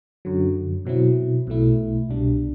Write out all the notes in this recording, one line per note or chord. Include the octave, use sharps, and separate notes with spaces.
F#2 D3 F#3
B2 F#3 C4 E4
B1 B2 A3 E4
C2 B2 G3 D4